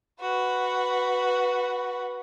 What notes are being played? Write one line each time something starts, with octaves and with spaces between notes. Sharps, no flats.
F#4 B4